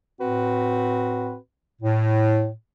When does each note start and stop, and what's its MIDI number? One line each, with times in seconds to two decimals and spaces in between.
0.20 1.35 45
0.20 1.35 60
0.20 1.35 66
0.20 1.35 71
1.82 2.50 45